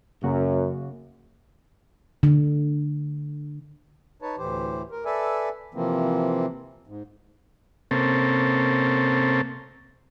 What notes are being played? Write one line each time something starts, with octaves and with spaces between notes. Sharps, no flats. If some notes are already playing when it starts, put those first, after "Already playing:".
F#2 C#3 A#3 F#4
D3
D#4 B4 C#5 A5
D2 A2 E3 G4 C5
A#4
A4 B4 D5 E5 G#5
C3 E3 F3 A#3 C4
G#2
C3 A#3 C4 C#4 A4